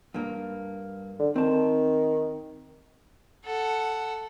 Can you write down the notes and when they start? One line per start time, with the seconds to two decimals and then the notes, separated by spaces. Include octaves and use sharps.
0.14 G2 A#3
1.19 D3
1.36 D#3 C4 A5
3.45 A4 F#5